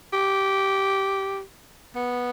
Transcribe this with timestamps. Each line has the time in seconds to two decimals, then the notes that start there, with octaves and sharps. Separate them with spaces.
0.13 G4
1.96 B3